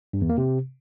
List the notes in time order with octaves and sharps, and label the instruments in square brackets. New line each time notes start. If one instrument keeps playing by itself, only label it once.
[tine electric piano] G2
E2
A#3
C3